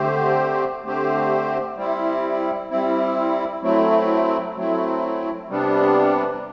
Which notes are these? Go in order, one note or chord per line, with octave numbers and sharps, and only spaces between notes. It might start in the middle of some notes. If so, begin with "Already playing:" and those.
Already playing: D3 A3 C4 G4 C5
D3 A3 C4 G4 C5
G3 C4 E4
G3 C4 E4
F#3 A3 C4 E4
F#3 A3 C4 E4
C3 G3 B3 D4